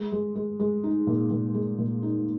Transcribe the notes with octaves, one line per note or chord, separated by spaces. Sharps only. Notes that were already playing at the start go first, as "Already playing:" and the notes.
Already playing: G#3
G#3
G#3
G#3
D#4
A#2
A#2
G#3
A#2
D#4